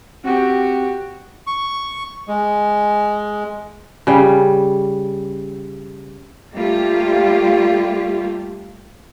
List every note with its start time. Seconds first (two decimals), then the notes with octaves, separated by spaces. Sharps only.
0.24 C4 F#4 G4
1.47 C#6
2.28 G#3
4.07 C#3 G3
6.54 G3 A3 A#3 F4 G4